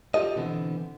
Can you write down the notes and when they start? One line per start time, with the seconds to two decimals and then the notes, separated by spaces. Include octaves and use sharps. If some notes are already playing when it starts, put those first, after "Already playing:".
0.14 F4 G4 A4 D#5
0.36 B2 D3 E3 B3 C4